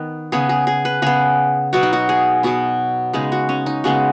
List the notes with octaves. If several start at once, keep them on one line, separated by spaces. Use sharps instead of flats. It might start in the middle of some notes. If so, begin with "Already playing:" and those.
Already playing: D#3 B3
C#3 B3 G#4
G#4
G#4
B4
C#3 B3 G#4
B2 F#3 B3 F#4
D#4
F#4
G#4
B2 F#3 B3 F#4
C#3 G#3 B3 D#4
F#4
C#4
D#4
C#3 G#3 B3 F#4